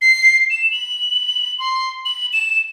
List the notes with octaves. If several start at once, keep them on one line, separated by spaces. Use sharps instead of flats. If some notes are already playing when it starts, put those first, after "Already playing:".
C7
E7
F#7
C6
F#7
E7